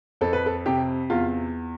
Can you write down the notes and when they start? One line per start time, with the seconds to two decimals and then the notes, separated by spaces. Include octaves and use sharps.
0.21 F2 A4
0.33 B4
0.46 A4
0.66 C3 G4
1.10 E2 F4